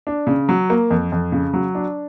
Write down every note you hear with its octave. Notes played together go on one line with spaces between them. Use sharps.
D4
C#3
F#3
A#3
F2
F2
C#3
F#3
D4